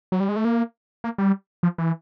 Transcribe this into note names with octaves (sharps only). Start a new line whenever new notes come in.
F#3
G3
G#3
A3
A#3
A#3
G3
F3
E3